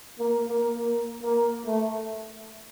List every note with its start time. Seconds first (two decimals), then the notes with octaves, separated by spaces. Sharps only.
0.19 A#3
0.48 A#3
0.77 A#3
1.21 A#3
1.66 A3